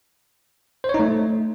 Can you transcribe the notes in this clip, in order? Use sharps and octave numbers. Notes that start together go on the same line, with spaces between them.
C5
C#5
D#4
A3